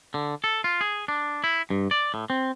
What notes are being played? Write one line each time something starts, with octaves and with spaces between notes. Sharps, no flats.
D3
A4
F4
G#4
D4
E4
G2
D5
A2
C4